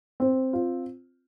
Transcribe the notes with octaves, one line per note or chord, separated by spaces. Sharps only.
C4
F4